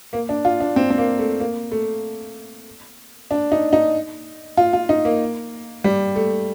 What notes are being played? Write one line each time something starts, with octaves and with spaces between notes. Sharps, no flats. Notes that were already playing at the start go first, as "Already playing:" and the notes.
A#3
D4
F4
D4
C4
C4
A#3
A3
A#3
A3
D4
D#4
D#4
F4
F4
D#4
A#3
G3
A3